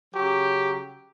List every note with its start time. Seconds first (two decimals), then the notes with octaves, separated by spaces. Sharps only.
0.14 C#3 F#3 G4